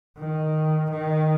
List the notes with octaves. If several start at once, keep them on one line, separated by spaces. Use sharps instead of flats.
D#3
D#3